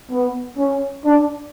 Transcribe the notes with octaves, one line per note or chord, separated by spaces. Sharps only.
B3
C#4
D4